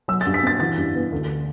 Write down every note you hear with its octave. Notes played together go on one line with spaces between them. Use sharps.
F#3 E6
A6
G2
B6
C4 A6
E3 A6
G2
B3
D2